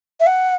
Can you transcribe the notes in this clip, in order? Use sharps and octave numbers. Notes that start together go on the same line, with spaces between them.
E5
F#5